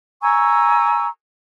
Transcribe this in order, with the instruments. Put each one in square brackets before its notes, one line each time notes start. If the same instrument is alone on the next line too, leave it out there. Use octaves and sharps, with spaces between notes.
[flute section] G#5 A#5 C#6 E6